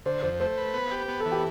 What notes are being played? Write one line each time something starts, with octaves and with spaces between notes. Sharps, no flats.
D3 C5
F2 C5
A3 C5
B4
B3
G4
B3
A4
E3
G4